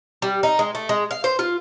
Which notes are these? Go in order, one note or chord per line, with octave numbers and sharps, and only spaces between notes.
G3
D#4
G#3
A3
G#3
F5
C5
F4